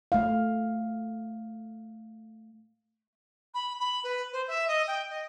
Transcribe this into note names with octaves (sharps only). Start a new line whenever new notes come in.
A3 F5
B5
B5
B4
C5
E5
D#5
G5
D#5